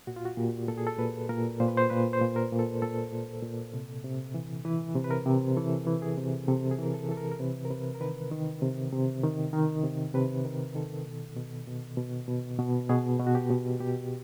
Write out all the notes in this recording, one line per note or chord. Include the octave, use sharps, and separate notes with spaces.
A#2 F#4
F4
F#4
A#2 G4
A#2 A4
G#4
A4
A#2 B4
A#2 A#4
A#2 C5
B4
C5
A#2 B4
C5
A#2
A#4
A#2
A4
A#2 A4
A#2
A#2
C3
C3
E3
E3 B4
C3
B4
A#4
C3
E3 A4
E3
G#4
C3
C3 A4
G#4
E3 A#4
A4
E3 A4
A#4
A#4
C3 B4
A#4
C3 B4
A#4
D#3 B4
D#3
C3
C3
D#3
D#3
C3
C3 B4
D#3 A#4
D#3 A4
B2
B2
B2
B2
B2
B2
B2 G#4
B2
F#4
G4
B2
B2 G4